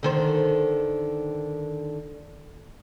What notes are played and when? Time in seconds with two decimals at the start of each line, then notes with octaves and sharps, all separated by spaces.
0.03 D3 D#3 C5